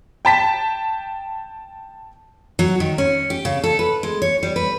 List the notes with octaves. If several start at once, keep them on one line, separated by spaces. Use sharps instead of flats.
G5 A5 B6
F#3
D#3
C#4
G4
C#3
A4
B4
G#3
C#5
G3
B4